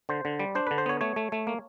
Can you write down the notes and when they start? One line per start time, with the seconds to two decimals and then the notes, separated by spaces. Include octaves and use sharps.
0.09 D3 C5
0.25 D3
0.40 G3
0.55 D4 C5
0.67 D3 B4
0.78 C5
0.86 B3 C#5
1.01 A3 C#5
1.16 A3
1.32 A3
1.47 A#3